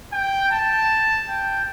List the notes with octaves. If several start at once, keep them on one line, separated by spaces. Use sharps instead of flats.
G5
A5
G5